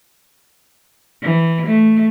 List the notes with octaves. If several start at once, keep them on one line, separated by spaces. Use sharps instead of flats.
E3
A3